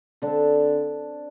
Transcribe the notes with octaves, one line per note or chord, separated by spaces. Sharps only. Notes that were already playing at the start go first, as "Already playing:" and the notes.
D3 C4 D4